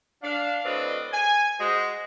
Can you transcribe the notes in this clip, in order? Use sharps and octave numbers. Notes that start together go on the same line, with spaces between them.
D4 F5
A2 C4 F#4 B4 D5 D#5
G#5
G#3 F#4 C5